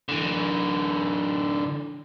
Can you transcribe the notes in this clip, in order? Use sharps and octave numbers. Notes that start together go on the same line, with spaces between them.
D3 E3